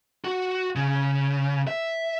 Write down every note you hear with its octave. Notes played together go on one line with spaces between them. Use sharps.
F#4
C#3
E5